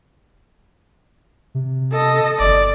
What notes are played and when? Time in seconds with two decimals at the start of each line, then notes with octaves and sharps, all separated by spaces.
1.55 C3
1.93 A4 D#5
2.39 G1 D5